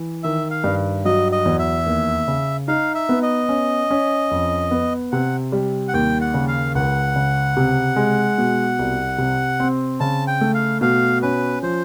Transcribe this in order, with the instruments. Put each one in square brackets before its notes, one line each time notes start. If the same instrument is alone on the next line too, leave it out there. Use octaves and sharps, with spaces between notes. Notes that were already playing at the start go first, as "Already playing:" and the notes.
Already playing: [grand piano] E3
[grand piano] D#3 [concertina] E5
[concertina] F5
[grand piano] G2
[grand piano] F#3 [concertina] D#5
[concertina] D#5
[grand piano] E2
[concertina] E5
[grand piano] D#2
C#3
[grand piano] D#4 [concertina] F5
[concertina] E5
[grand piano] B3
[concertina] D#5
[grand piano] C#4
C#4
F2
B3
[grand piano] C3 [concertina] F#5
[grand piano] G3
[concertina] F#5
[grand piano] D#2 [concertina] G5
[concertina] F#5
[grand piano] C#3
[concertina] F5
[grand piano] C#2 [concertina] F#5
[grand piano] C#3
C3
G#3
B2
C2
C3
C4
[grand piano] C#3 [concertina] A5
[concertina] G5
[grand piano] A3
[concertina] F5
[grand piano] B2 [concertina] F5
[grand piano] C#4 [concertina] B4
[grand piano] F3 [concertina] C5